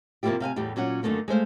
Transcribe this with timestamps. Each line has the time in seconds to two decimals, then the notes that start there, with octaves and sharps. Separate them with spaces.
0.23 C3 F3 A#3 E4 F4 G4
0.40 C3 F5 G5 G#5
0.56 E2 A2 G3 G4
0.76 A#2 F#3 C#4 F#5
1.03 F#2 D3 D#3 A3 A#3
1.28 G#3 A3 C5 F5